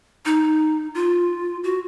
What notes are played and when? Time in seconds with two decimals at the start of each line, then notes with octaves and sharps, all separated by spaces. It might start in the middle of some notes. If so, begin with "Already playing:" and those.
0.26 D#4
0.95 F4
1.64 F#4